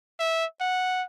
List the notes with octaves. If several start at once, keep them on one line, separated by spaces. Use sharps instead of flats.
E5
F#5